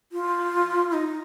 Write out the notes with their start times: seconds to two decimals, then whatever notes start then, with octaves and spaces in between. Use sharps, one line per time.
0.12 F4
0.93 D#4